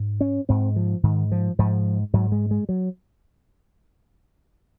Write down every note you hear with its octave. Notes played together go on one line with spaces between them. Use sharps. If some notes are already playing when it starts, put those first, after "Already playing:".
Already playing: G#2
C#4
G#2 C4
F3
G#2 D#3
F3
G#2 F3
G#2 F#3
G#3
G#3
F#3